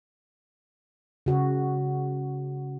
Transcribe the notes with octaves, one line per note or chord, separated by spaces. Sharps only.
C#3 F#4